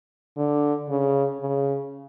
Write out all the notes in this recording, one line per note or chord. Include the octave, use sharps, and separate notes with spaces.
D3
C#3
C#3